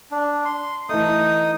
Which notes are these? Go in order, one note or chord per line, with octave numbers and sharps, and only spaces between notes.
D4
C6
E3 A3 D#4 D#6